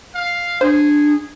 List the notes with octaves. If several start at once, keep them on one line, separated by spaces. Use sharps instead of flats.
F5
D4 G#4 C5